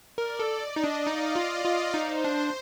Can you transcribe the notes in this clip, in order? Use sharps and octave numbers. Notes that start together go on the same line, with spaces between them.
A#4 D5
A4
D#5
D#4
D4
D#4 F5
F4
D#5
F4
D#4 C5
D4